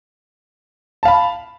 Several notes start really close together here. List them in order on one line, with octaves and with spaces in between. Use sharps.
A5 F5 B5